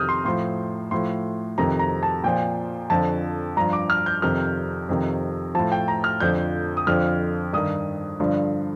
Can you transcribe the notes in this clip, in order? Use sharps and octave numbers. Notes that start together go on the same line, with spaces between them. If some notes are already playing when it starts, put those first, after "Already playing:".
Already playing: F2 C3 D#3 D#6 F6 G6
C6
A2 F3 C6
A2 F3 C6
F2 C3 D#3 A#5
A#5
A5
A#2 F3 G5
F2 D3 F3 A5
G2 F3 A#5
D6
F6
G6
F2 C3 D#3 F6
F2 C3 D#3
A2 F3 A5
G5
A#5
F6
F2 D3 F3 G6
D#6
F2 D3 F3 F6
G2 D#3 D#6
G2 D3 F3